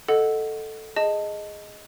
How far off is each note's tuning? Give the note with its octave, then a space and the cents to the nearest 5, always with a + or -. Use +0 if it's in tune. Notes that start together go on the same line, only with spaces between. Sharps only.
A4 +0 D#5 +0 F#5 +0
G#4 +0 D#5 +0 A5 +15